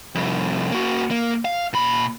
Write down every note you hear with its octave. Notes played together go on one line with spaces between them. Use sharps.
C2 F2
A#3 F#4
A#3
F5
A#2 B5